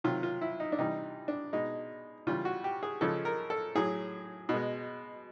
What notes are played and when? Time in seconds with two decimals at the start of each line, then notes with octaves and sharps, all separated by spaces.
0.04 C3 D#3 F#3 F4
0.23 F4
0.41 E4
0.60 D#4
0.72 D4
0.78 C3 E3 G3 D#4
1.28 D4
1.53 B2 G#3 D#4
2.27 C#3 E3 G3 F4
2.45 F#4
2.64 G4
2.83 G#4
3.01 C#3 F3 G#3 A4
3.25 A#4
3.50 A4
3.75 A2 F#3 G#4
4.49 B2
4.54 G#3